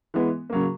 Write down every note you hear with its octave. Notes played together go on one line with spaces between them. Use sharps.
E3 G#3 B3
C#3 F#3 A#3